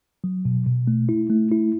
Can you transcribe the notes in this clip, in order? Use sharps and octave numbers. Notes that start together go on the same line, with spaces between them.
F#3
B2
B2
A3
E4
A3
E4